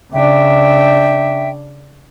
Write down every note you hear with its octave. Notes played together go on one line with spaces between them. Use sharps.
C#3 D4 E5 G5